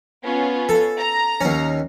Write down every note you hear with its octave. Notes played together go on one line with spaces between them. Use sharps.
B3 C#4 F4
A4
A#5
D#2 C#4